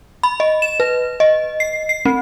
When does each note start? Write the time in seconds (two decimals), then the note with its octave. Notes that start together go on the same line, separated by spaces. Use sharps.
0.23 B5
0.40 D#5
0.62 E7
0.80 B4
1.20 D#5
1.60 C7
1.89 C7
2.05 C4